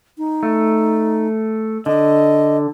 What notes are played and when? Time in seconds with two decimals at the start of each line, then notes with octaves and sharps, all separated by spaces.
0.18 D#4
0.43 A3
1.86 D3 D#5